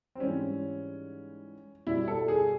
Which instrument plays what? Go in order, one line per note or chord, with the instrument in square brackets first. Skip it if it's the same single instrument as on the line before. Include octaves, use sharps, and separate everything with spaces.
[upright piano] C4
G#2 E3 G3 C#4
B2 G3 E4
A4
G#4